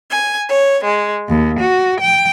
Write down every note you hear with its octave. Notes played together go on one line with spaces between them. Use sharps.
G#5
C#5
G#3
D#2
F#4
G5